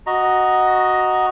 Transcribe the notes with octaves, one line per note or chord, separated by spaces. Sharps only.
F#4 D#5 A#5